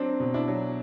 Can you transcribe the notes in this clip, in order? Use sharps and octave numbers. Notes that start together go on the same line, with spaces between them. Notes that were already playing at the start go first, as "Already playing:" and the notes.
Already playing: F#3 C4 D4
B2
D4 E4
F#3